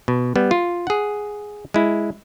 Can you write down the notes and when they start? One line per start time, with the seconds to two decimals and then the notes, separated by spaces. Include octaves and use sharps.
0.08 B2
0.36 G3 B3
0.51 F4
0.87 G#4 F#5
1.74 G#3 E4